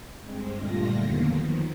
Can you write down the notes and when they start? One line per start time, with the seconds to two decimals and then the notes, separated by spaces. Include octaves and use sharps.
0.21 G2 G#3 C4
0.54 A#2 D3 G3 A3 F4 A#6
0.94 E2 D3 D#3 F#3 A#3 B3
1.31 D#3 F3